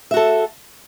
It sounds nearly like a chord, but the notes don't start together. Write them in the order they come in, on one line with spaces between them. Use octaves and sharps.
E5 F#4 A4